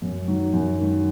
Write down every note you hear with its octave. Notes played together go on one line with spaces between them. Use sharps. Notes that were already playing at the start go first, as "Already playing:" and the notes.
F#2
D#3 F#3
F#2
D#3 F#3